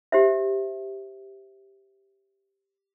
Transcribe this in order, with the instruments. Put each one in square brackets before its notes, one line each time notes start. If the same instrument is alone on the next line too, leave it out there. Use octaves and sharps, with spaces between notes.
[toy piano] G4 C5 E5